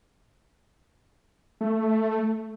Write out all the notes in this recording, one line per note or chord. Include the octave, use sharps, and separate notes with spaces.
A3